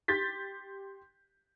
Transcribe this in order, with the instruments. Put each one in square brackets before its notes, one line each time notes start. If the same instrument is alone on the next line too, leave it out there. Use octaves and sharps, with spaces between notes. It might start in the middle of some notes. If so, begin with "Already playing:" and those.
[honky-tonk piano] G4 C6 G6 A6 B6